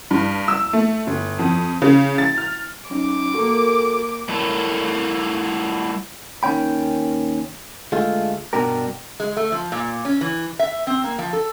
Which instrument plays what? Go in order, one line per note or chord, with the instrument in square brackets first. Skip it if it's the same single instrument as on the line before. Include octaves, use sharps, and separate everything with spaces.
[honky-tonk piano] G2
E6
A3
G1
F2
C#3
A6
F6
[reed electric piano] F#3 C#4 D#4 [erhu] D6
[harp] A#3 C#6 [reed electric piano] F#4 A4
[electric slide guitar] G3 A3 E4 A4 A#4 C#5
[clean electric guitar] D#2 D#3 C#4 G5 B5
D2 G#3 A3 F4
G2 B2 G3 D4 G4 A#4
[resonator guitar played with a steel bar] G#3
A3
F3
A#2
C#4
E3
E5
C4
A#3
F3
A4